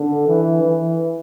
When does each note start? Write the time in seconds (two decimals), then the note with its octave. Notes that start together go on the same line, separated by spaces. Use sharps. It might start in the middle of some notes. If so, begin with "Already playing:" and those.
Already playing: D3
0.28 E3
0.62 E3